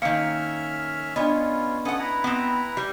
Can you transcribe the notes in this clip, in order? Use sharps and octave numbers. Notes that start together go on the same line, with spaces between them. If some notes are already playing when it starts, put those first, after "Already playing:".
D#3 A#3 C#4 E5 F5 F6 C#7
B3 C#4 D4 F4 D5 D#5
B3 C#4 A4 F#5 D#6
E4 B4 A#5
B3 C4
G3